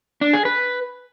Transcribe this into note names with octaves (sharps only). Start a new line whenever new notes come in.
D4
G#4
B4